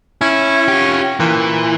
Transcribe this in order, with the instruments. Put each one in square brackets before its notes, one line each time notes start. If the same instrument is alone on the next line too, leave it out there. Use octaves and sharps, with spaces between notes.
[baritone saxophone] C#4 [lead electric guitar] E4
[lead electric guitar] F4 G4
[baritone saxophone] A#2 [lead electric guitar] E3